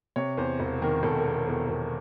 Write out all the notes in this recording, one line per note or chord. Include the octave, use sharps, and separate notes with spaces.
C3 C#5
E2 C5
E1
D#3 A#4
E1 A4
A#4
E2
A4
E2 A4
E1